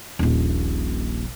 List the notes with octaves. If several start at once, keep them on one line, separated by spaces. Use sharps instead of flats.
D#1 A#1